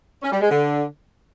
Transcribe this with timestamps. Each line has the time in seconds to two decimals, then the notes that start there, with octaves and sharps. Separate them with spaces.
0.23 C#4
0.32 G3
0.41 G#3
0.51 D3